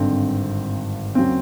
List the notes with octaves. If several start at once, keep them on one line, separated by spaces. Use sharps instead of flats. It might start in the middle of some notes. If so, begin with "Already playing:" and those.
Already playing: G#1 G2 D3 C4
D#2 C#3 F#3 C4